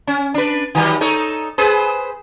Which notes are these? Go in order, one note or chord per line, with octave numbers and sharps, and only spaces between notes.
C#4
D4 B4
D#3 F#3 G3
D#4 A4 C#5
G#4 B4 C5